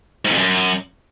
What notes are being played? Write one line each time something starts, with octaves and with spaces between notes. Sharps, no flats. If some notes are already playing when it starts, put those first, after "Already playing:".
G#2
F2
F#2